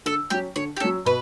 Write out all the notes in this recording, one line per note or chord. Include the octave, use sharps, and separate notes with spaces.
D3 A4
F#3 C#4 G4
D3 C#5
G4
F#3 C#4 A4
B2 B4